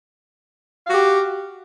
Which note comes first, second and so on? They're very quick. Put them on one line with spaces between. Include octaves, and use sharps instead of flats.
F5 F#4 G4